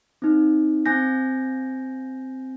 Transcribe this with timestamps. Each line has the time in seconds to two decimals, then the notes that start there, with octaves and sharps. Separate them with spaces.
0.22 C4 D#4
0.86 C4 G#5 G6 A#6